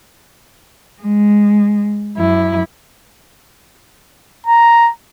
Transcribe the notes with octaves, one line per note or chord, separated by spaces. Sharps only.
G#3
F#2 E4
A#5